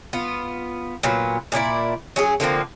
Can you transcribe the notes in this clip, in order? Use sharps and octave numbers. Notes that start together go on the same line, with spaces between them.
B3 F4
A#2 F#3 B3
A#2 D4 E4 D5
F#3 C#4 G#4
D3 F3 A#3 C4